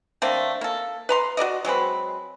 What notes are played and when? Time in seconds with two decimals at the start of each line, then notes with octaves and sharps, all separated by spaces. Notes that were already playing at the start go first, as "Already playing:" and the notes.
0.22 D3 A3 A#3 C4
0.61 A#3 A4
1.09 B4 A#5 C6
1.37 F#4 A#4 D5 D#5
1.65 F#3 G#3 C4 B4